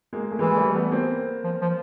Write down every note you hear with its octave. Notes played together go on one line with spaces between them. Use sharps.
G#3 A#3
A3
E3 G#3
G3 A3
A3 B3
A#3 C4
F3
F3